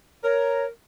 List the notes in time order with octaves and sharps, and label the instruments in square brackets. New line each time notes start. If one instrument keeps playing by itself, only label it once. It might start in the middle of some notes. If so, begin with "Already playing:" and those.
[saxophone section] A#4 [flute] C#5